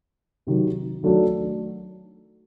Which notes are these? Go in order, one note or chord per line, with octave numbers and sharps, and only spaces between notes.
C3 D#3 F#3
D#3 F#3 A3 D4 F#4